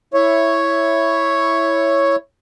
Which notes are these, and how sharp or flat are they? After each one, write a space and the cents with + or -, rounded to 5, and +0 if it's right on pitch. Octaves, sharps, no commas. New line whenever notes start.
E4 +0 C#5 +0 E5 +5